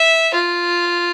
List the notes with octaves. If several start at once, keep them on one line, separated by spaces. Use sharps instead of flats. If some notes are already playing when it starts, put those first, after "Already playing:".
Already playing: E5
F4